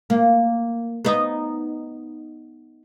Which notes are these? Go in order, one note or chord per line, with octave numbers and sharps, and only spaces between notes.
A#3
B3 D#4